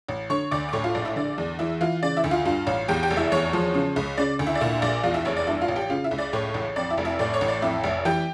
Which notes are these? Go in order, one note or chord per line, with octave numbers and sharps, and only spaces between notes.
A1
D3 C#5 C#6
D2 D5 D6
D6
A2 C#5 C#6
F4 F5
A#1 D5
E4 E5
D3 D5
E2
E3 E4 E5
E3 F4 F5
C#3 D5
E4 E5
D2
F4 F5
G2 F4 F5
A1
E2 G4 G5
G4 G5
F1
E4 E5
E2 C#5
F3
C#3
C#2
C#3 D5
D2
E4 E5
D5
A#2 E4 E5
A#1 D5
E2 F4 F5
E4 E5
F1 C#5
D5
G2 E4 E5
F4 F5
A1
G4 G5
C#3 F4 F5
E4 E5
C#2
D5
A2 C#5
A1
F2 D5
E4 E5
F1
E4 E5
A2 D5
C#5
A1
D5
F2 E4 E5
F1
E3 G4 G5